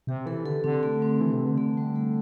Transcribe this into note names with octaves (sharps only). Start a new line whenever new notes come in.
C3 G4
E3 A4
D3 A4
D3 C4
A3
C4
E3
C3
D3
A3
G3
A3